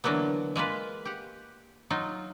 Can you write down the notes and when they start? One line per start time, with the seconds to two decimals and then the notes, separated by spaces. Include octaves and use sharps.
0.04 D3 E3 F#3 A#3 B3
0.56 G#3 A#3 F4 B4
1.05 G4 F#5
1.90 F#3 D#4 F4